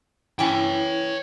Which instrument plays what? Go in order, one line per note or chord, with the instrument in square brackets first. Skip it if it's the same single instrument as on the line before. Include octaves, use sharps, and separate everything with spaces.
[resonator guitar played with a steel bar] E3 C#4 [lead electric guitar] C#5 G5